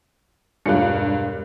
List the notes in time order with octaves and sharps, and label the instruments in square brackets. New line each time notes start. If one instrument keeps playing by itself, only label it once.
[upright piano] E1 C#5 C#7 [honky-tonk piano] G2 F4 F#6